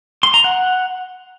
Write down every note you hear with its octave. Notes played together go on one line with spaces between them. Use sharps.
C6
A#5
F#5